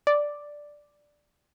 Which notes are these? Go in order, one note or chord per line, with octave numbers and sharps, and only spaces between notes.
D5